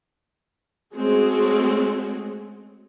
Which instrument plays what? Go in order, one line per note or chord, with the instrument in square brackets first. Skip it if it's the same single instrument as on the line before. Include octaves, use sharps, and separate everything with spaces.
[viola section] G#3 A3 C4 C#4 F#4 G#4